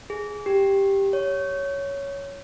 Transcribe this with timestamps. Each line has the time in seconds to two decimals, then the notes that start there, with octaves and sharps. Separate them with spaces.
0.10 G#4
0.46 G4
1.13 C#5